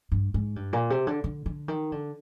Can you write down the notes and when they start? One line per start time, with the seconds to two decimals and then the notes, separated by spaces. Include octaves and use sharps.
0.12 G2
0.34 G#2
0.56 G2
0.73 A#2
0.90 C3
1.07 D3
1.24 D3
1.46 D3
1.68 D#3
1.92 D3